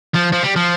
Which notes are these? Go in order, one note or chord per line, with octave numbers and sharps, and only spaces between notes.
F3
F3
G3
F3